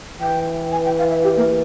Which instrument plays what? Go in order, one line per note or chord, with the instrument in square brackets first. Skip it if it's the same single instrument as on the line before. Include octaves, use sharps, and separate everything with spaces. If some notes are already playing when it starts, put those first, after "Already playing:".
[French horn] E3 [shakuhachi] G5
[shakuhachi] G#5
G5
F5
E5
G4
A#3